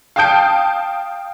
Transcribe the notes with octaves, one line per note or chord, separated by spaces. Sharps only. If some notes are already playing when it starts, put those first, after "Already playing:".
F5 G5 A5 D#6 G6 D7